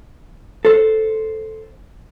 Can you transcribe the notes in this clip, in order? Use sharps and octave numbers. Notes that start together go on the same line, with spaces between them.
A4 C5